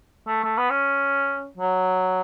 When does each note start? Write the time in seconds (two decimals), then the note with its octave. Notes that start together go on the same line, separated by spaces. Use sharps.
0.27 A3
0.44 A3
0.58 B3
0.70 C#4
1.58 F#3